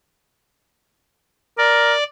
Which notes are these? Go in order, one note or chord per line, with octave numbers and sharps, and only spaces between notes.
A#4 D5